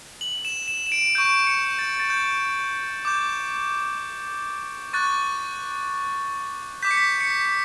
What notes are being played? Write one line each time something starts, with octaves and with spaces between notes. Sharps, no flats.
F#7
E7
E7
E7
D7
C#6 G6 D7
C#7
A6
A6
G6
D6 G6
C#6 F#6 A6
D6 G6 B6
C#7
B6
C#7
B6